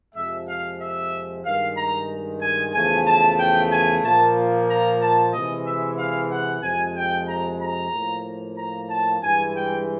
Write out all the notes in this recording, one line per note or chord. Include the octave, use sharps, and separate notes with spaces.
F2 C3 F3 G#3 E5
F5
E5
G2 D#3 G#3 F5
A#5
G#5
E2 C#3 F3 A3 G#5
A5
G5
G#5
A#2 F3 A#3 A5
A#5
A5
C3 E3 G#3 D#5
E5
F5
F#5
F2 C3 F3 G#3 G#5
G5
A#5
A#5
A2 F3 A#3
A#5
A5
G2 E3 G#3 G#5
G5